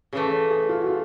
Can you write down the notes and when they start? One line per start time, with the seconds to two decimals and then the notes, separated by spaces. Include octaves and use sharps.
0.13 C#3 E3 A3 G#4
0.32 A4
0.51 G#4
0.69 F4
0.81 F#4
0.87 F4